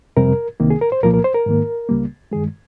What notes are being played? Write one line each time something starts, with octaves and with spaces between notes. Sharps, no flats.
F2 C3 G3 A#4
C2 C3 D#3 A#3
G#4
A#4
C5
C2 A#2 F3 A#3 A#4
A#4
C5
A#4
G#2 D#3 A#3
C#2 C#3 G3 A#3
G2 D#3 G#3 G#4